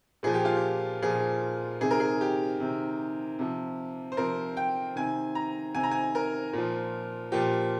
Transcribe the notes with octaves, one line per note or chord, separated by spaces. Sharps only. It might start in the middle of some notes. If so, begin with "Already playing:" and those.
A#2 F3 G#4
G4
F4
G4
A#2 F3 G#4
C3 D#3 G#4
A#4
G#4
G4
C3 D#3
C3 F3
C5
C3 F3 A#4
G5
C3 D#3 G#5
A#5
C3 D#3 G#5
A#5
G#5
A#4
A#2 F3
A#2 F3 G4